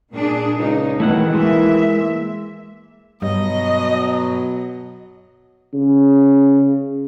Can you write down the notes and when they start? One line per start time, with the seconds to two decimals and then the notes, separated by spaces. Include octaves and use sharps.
0.15 A#2 D4 G#4
0.59 C#2 D#4
1.00 B2 D#3 E3 A3 E4 F#5
1.35 G#3 A#3 E5
3.22 G2 B2 F#3 D#5
5.74 C#3